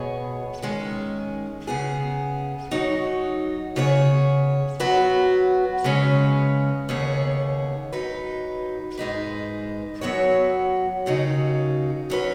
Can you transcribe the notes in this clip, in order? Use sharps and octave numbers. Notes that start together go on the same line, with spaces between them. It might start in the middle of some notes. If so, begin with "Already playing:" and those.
Already playing: B2 B3 G#4 C#5
D#3 G#3 C#4
C#3 B3 G#4
F#3 D#4 F#4 C#5
C#3 B3 G#4 C#5
F#3 B3 F#4 B4
C#3 G#3 C#4 B4
D#2 C#3 B3 G#4 C#5
F#3 D#4 B4
G#2 G#3 D#4 B4
F#2 F#3 B3 F#4 C#5
D#2 C#3 F#3 D#4
F#3 C#4 B4